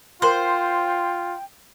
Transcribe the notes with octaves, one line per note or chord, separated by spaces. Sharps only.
F4 A#4 C5 G5 C6